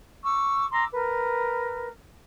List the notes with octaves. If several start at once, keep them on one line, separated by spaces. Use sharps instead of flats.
C#6 D6 E6
A#5 C6 D6 E6
A#4 B4